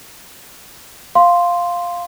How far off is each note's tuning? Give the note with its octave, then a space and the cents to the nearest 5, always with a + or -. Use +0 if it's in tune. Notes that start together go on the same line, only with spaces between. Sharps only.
F5 +0 C6 +0